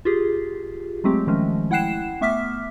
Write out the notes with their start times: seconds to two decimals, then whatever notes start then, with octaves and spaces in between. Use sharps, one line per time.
0.05 F4 G4 G#4
1.04 F#3 G#3 A3 C4 G4
1.27 D#3 F3 G#3 A3 C#4
1.71 E4 F#5 G5 F#6 C7 E7
2.21 A3 B3 E5 D6 F6 B6